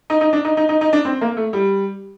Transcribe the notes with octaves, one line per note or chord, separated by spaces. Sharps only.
D#4
D#4
D4
D#4
D#4
D#4
D#4
D4
C4
A#3
A3
G3